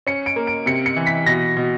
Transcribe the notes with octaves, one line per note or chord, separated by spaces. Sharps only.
C#4 C#7
D7
A#3
D7
C3 C#7
C#7
E3
B6
B2 A#6
B2